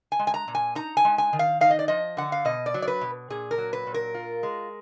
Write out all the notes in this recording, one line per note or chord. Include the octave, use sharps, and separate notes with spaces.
G#5
G#3
G#5
A#5
A#2
G#5
D#4 A#5
G#5
G#3
G#5
D#3
F5
D#4 F5
D#5
D5
F3 D#5
D3 F#5
F5
B2 D#5
D5
F#3
D5
B4
B2
A#2 G#4
A#4
F#3
B4
A#2
A#4
F4
G#3